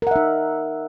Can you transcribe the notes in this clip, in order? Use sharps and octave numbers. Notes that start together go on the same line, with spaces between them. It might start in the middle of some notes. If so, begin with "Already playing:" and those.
D#4 A#4 E5 F#5